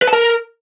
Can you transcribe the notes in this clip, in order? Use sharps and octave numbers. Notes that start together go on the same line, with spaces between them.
B4
A5
A#4